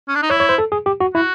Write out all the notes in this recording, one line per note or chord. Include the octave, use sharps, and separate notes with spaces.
C#4
D4
D#4
E4 C#5
C#5
C5
A4
G#4
G4
F#4
E4 F#4